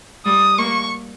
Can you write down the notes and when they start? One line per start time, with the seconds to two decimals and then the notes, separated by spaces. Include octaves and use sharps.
0.25 G3 D#6
0.58 A#3 C#6